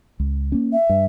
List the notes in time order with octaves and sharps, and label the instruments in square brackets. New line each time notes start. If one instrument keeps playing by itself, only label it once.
[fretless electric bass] C#2
A#3 C#4
[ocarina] E5
[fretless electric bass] G2